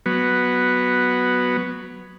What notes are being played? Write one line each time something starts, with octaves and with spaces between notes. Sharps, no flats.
F#3 B3